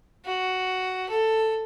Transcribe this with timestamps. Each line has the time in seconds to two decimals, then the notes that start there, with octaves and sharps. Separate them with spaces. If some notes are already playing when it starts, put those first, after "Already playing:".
0.25 F#4
1.09 A4